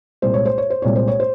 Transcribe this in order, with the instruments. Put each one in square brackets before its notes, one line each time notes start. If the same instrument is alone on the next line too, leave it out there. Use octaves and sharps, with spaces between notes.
[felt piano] C2 A#2 G#3 C5
C#5
C5
C#5
C5
C2 A#2 G#3 C#5
C5
C#5
C5